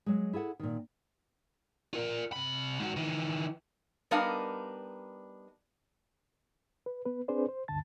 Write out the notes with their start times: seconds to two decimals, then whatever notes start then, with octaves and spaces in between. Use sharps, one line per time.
0.06 F#3 G#3
0.33 E4 G#4 A4 F#5
0.59 A#2 D#3
1.93 F4 A#4
2.32 C3 B5
2.80 G#2 F#4
2.97 D#3 E3
4.11 G3 B3 D4 D#4 A#4 F5
6.86 B4
7.05 B3 B4
7.28 C4 D4 G#4 B4 C5 D5
7.49 C5
7.68 D2 G2 D3 A5 A6